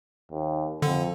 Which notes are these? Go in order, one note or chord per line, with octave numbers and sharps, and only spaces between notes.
D#2
F2 D3